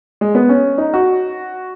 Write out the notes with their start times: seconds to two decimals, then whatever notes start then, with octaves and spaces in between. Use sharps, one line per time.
0.21 G#3
0.35 B3
0.49 C#4
0.78 D#4
0.94 F#4